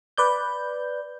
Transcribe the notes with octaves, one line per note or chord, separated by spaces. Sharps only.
B4 D5 G6